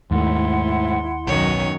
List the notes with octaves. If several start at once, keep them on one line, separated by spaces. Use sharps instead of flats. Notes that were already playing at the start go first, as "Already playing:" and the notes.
D#2 G#2 A3 E4 F#5 C6
B1 F#2 D#3 C#5